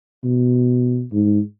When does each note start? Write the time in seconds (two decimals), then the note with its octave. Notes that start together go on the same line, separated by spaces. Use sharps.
0.24 B2
1.13 G#2